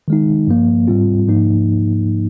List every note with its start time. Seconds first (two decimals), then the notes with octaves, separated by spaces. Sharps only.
0.08 D#3 G#3 D#4
0.47 G2 F3 A#3
0.87 G#2 G3 C4 F4
1.27 G#2 F3 A#3 D#4